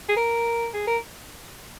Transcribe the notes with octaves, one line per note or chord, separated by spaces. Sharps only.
G#4
A#4
G#4
A#4